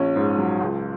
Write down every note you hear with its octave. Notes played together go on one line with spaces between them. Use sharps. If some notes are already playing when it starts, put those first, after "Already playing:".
Already playing: A#1 C#4
G#2
F#3
C#2